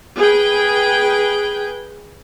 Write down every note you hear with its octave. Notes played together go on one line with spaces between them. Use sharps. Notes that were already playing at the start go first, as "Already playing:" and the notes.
G#4 B4 G5